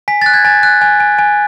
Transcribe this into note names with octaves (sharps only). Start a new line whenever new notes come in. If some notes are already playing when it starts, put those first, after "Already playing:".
G#5 B6
F#6 A6
G#6
G#5 A6
F#6
G#5
G#5
G#5